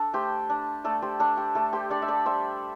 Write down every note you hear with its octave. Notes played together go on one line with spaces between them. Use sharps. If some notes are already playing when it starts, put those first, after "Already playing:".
Already playing: D4 A4
A3 G4 C5
D4
A3 A4 D5
G4 C5
D4 A4
G4
A3 A4
G4 C5
D4 A4 D5
E5
A4 D5
G3 C5 E5